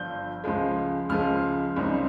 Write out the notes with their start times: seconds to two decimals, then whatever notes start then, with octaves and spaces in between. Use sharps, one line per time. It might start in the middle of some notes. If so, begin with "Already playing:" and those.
Already playing: G1 G2 F3 G6
0.44 C#2 C#3 F3 G#3
1.09 C#2 C#3 F3 G#3 F6
1.76 C#2 C#3 G3 C4 D#4